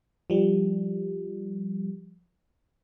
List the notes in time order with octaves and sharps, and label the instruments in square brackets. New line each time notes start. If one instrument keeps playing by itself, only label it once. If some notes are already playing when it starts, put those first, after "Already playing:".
[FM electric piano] F3 G3